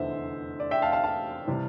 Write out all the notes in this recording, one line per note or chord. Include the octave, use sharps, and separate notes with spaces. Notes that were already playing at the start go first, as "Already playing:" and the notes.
Already playing: F1 E2 D3 C5 E5
D5
E5 G5
F5 A5
F5 A5
F5 A5
C3 E3 G3